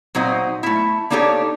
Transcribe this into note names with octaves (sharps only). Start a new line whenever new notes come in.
A#2 F#3 C4 D#4 C5 D#5
A3 E4
A#3 D4 D#4 G4 A4 C#5